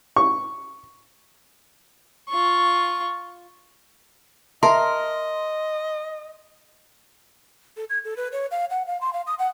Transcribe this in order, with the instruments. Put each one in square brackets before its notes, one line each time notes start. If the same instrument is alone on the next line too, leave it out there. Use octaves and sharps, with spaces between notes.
[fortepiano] C#6
[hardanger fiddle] F4 C#6
[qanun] A#4 [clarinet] D#5 [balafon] E5 A5 [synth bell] C6
[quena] A4
G#6
A4
B4
C#5
F5
F#5
F5
C6
F5
D#6
F#5